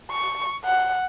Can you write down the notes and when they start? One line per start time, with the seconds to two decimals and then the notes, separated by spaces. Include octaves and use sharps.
0.11 C#6
0.64 F#5